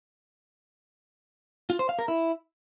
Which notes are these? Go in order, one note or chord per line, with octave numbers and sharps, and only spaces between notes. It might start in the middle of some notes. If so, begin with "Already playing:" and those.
F4
C5
F5
A#4
E4